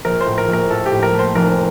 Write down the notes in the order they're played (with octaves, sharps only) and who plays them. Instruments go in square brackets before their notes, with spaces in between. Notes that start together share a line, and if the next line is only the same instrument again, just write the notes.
[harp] A#1 [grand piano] A#4
[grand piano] C5
[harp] A2
[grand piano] A#4
[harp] A#1
[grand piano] A#4
[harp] A2 [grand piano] A4
[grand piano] G4
[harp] A2
[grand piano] A#4
[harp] A3
[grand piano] C5
[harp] F1 [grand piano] A#4